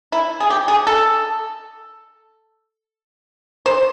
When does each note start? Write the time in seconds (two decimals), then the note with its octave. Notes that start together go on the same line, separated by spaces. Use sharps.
0.12 E4
0.40 G#4
0.50 G4
0.68 G#4
0.87 A4
3.66 C5